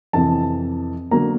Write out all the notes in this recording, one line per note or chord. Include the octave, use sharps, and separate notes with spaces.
F2 C3 E3 A5
D3 F#3 A#3 A#5